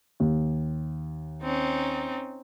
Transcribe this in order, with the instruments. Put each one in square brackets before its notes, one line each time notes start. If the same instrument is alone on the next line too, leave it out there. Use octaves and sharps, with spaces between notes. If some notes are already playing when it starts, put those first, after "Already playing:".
[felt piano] D#2
[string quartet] C4 C#4 D#4